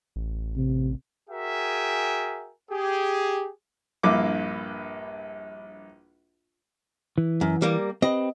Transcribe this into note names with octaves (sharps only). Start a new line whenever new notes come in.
A1
C3
F#4 G#4 A#4 E5 G5 G#5
G4 G#4
A#1 G2 A#3 E4 D6
E3
F#2
G3 A#3
C4 G4 B4 D#5